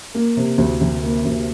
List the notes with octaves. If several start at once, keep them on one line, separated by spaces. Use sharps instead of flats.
A#3
C3
D2
D2
A#3
D2